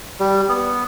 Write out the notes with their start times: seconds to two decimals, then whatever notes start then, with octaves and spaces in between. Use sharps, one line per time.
0.20 G3
0.49 B3